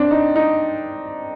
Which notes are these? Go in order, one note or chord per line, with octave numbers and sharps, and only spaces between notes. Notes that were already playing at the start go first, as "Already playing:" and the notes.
Already playing: C4 D4
D#4
D#4